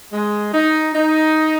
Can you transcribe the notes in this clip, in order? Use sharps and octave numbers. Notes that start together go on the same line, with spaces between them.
G#3
D#4
D#4